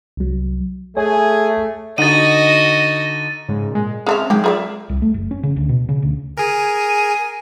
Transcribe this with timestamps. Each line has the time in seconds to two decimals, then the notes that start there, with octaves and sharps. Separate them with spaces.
0.17 C2 F#3
0.97 A3 G#4 C#5 G#5
1.98 D3 D#4 F#4 D#5 F#5 A6 D#7
3.48 G#2 C#3
3.71 A#2 G#3
4.07 G#3 C4 C#4 A4 E5 F6
4.30 D#3 F#3 G#3 G4
4.44 F4 G#4 A#4 D5 E5
4.89 C2
5.02 A3
5.14 F#1
5.31 C#4
5.43 C#3
5.56 D2
5.69 B2
5.89 C#3
6.02 D2
6.37 G#4 A#4 G#5